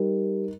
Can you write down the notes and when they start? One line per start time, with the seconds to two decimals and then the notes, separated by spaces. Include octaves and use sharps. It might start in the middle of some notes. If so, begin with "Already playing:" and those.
Already playing: G3 D#4 A#4